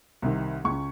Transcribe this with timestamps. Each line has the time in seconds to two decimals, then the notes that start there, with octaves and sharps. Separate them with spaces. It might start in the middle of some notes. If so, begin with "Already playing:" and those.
0.22 C2 C3 D#3
0.64 C#2 C#3 C#6